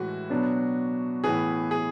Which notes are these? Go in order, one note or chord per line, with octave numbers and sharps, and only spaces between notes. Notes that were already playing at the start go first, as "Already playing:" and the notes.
Already playing: A2 E3 G#3 F#4
B2 F#3 B3 D4
A2 E3 B3 G#4
G#4